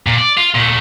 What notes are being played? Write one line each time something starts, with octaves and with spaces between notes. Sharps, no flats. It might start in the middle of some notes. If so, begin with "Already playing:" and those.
A#2
D5
F4
A#2 A3